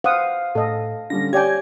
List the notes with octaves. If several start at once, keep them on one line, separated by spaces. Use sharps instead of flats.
C5 F5 F#5 D#6
A2 A4 D#5
D3 G3 C#4 A#6
G4 C#5 D5 G5 G#5 G#6